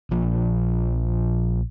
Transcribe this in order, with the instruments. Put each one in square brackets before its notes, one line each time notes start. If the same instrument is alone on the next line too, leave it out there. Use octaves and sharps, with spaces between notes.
[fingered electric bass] A#1 F3